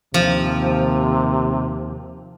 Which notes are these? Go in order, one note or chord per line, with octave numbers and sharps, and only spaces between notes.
D#2 C3 F3